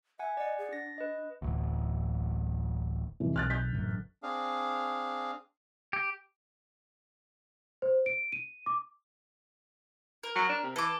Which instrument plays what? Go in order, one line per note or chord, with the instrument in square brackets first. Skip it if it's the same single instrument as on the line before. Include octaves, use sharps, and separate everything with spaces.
[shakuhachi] E5 [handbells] F#5 G#5
[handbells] D5 F#5 [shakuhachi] D#5
[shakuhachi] G#4
[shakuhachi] D4 [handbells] A6 A#6
[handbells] B4 D#5
[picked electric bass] D1 A1 D2
[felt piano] F1 E3
[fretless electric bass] B1 [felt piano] F6 F#6 A6
[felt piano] G6 B6
[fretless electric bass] A1 F#2 D3
[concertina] C4 D4 G#4 F5
[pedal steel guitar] G4
[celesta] C5
D7
D#7
D6
[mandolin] A#4
[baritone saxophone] F#3
D4
C3
[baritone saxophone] E3 [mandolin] A4 D6